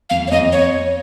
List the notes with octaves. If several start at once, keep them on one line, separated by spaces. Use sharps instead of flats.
F2 F5
C#5
F2 D#5
C#5